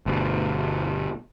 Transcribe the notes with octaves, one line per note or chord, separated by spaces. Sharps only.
G1 B2